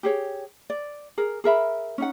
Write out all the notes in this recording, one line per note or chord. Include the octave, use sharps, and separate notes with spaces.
G4 G#4 C#5
D5
G#4 A#4
G#4 A#4 E5 B5
C#4 D#4 F#5